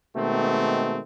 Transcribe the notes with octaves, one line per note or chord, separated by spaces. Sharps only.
B2 D#3 G#3 A3 C4